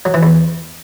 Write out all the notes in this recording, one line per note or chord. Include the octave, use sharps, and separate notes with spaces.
F#3
E3
E2